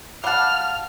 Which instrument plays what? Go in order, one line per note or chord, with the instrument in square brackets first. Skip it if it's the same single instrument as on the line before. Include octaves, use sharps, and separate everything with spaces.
[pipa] G3 F#5 [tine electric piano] F5 A5 [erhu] F6